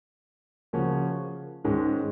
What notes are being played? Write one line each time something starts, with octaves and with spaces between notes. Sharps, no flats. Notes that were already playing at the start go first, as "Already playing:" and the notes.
C#3 F3 A#3 C#4 F#4
G#2 D#3 G#3 C#4